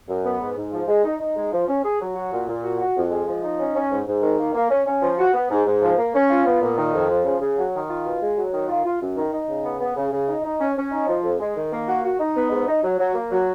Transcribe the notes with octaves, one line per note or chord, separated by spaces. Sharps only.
F#2
B3
G#2
G#2
F3
G#3
D#4
D#4
G#3
F3
C#4
G#4
F#3
F#4
A#2
A#2
F#4
F#4
F2
G#3
F3
D#4
C#4
C#4
G#2
G#2
D#3
A#3
A#3
C#4
C#4
F3
F#4
B3
G#2
G#2
F3
A#3
C#4
F4
B3
A#2
D#3
F2
F3
C#3
C#3
F#3
D#3
F4
B2
G#3
F#3
D#3
F4
F4
F#2
D#3
D#4
C#3
B3
B3
C#3
C#3
D#4
D#4
C#4
C#4
D#4
F3
F2
G#3
D#3
A#3
F#4
F#4
D#4
B3
G#2
D#4
F#3
F#3
A#3
F#3